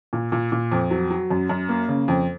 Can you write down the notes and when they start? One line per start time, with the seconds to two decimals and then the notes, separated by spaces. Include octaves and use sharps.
0.13 A#2
0.32 A#2
0.52 A#2
0.72 F2
0.91 F#3
1.10 F#3
1.30 F#2
1.49 F#2
1.69 A#3
1.89 C#3
2.08 F2